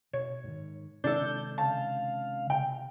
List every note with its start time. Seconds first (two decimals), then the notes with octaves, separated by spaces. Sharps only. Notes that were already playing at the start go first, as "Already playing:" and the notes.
0.13 B2 C#5
0.44 G#2 D#3
1.04 C3 D#3 G#3 D4 A4 G6
1.58 C#3 F5 A5
2.50 C3 G5